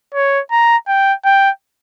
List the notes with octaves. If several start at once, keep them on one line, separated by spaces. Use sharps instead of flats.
C#5
A#5
G5
G5